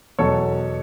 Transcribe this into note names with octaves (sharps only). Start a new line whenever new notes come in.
E2 B2 F#3 A4 C#5